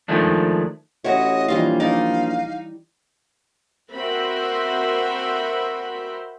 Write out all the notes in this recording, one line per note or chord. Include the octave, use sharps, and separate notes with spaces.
D#3 F3 G#3 A3 D4
A1 E4 F#4 C#5 D#5
A#1 E3 G3 F4 F5
D#4 D5 F5
C4 F#4 A#4 C5 E5 B5